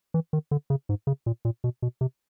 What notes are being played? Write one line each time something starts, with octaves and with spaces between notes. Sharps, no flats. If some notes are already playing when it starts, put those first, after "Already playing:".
E3
D#3
D3
C#3
G#2
C#3
A#2
A#2
B2
B2
C3